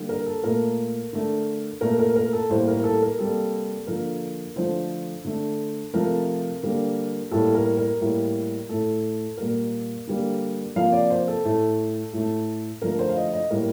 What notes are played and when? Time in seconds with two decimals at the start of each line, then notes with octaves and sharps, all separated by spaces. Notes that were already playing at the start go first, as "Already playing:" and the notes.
Already playing: D3 G3 A#3
0.09 A#4
0.26 A4
0.43 A#2 A3 A#4
1.13 D3 A3
1.81 A#2 A3 A#4
1.99 A#4
2.16 A#4
2.33 A4
2.50 A2 G3 A#3 C5
2.68 A#4
2.84 A4
3.02 A#4
3.19 C3 G3 A#3 A4
3.87 D3 F3 A#3 A#4
4.56 D3 F3 A3 C5
5.25 D3 A3
5.94 C3 F3 A3 A#4
6.63 D3 G3 A#3
7.31 A2 G3 A#3 A4
7.54 A#4
7.77 A#4
8.01 A2 G3 A#3
8.69 A2 A3 A4
9.37 A#2 G3 A#3 A#4
10.07 D3 G3 A#3
10.76 C3 F3 A#3 F5
10.92 D5
11.10 C5
11.28 A4
11.45 A2 A3
12.13 A2 A3
12.82 D3 F3 A3 A#4
12.99 C5
13.10 F5
13.16 D#5
13.33 D#5
13.50 A2 G3 A#3 A#4